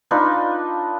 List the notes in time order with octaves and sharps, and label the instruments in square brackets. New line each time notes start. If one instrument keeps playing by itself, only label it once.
[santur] D4 D#4 F4 B4